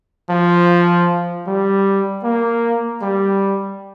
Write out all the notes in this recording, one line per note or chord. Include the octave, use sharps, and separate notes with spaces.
F3
G3
A#3
G3